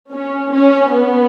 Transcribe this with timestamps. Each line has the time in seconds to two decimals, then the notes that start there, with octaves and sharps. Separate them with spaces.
0.13 C#4
0.53 C#4
0.92 B3